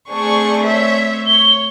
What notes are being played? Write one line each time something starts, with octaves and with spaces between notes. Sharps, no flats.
A3 C4 D4 G#4 C5 C#6
C#5 E5
C#5 G7